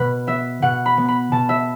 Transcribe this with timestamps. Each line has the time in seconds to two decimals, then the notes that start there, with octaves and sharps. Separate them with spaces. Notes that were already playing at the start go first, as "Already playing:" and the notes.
Already playing: B2 B4
0.27 B3 E5
0.62 B2 F#5
0.86 B5
0.97 B3
1.08 B5
1.32 B2 A5
1.49 E5